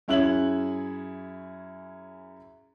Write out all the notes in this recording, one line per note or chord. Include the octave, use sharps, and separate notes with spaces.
F#2 C#4 E4 G#4 F#6 F#7